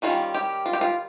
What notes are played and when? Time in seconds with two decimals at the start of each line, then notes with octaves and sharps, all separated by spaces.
0.02 D#3 G3 C#4 F4
0.34 G4
0.66 F4
0.73 G4
0.81 F4